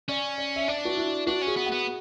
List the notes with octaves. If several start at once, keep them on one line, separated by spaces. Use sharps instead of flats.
C#4 D5
D5
E5
D4 D5
F#4
E4
D4 F#4
C#4
G#4
B3
F#5
B3